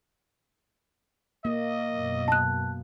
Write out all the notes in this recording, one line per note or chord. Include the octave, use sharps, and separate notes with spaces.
A#3 D#5
F#2 B2
A5 F#6